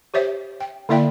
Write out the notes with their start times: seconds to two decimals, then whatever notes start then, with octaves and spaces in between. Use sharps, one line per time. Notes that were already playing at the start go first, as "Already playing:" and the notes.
0.14 G4 C5 C#5 E5
0.60 G5
0.89 D3 A#3 E4 D5 E5 G5